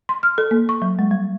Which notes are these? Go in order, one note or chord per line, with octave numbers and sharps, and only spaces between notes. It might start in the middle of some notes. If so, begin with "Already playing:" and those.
C6
F6
A4
A#3
C#6
F#3
G#3
G3